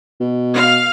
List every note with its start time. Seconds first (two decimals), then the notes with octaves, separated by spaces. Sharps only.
0.20 B2
0.54 F5